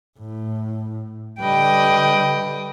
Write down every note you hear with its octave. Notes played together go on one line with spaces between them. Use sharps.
A2
D3 G3 B4 D#5 G5